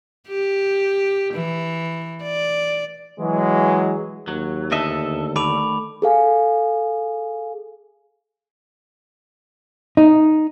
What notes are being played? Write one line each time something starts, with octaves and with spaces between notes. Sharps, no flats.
G4
E3
D5
E3 F#3 G#3
D#2 F#3
D2 D4 A4 D#5 E5
D#3 A3 D5 B5 D6 F7
G#4 A4 F5 G#5
D#4